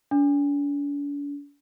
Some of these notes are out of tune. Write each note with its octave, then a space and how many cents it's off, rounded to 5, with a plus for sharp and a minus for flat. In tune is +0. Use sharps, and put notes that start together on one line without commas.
D4 -45